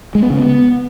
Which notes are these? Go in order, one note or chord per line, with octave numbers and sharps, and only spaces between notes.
G#3
B3
C#3
B3